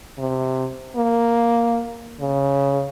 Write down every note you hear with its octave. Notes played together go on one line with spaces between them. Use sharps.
C3
A#3
C#3